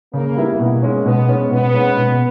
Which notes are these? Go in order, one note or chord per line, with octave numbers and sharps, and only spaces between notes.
C#3 A#3
G3 B3 E4
B2 A#3
G#3 C#4
B2 B3
G#3 C#4
B2 B3
G#3 C#4
B2